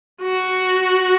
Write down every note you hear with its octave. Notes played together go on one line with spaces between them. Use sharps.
F#4